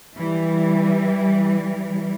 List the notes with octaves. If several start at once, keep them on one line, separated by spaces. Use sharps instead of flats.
E3 G3